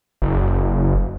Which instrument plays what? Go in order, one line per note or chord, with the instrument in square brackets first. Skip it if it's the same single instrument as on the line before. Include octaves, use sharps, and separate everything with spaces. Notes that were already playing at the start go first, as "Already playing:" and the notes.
[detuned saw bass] F#1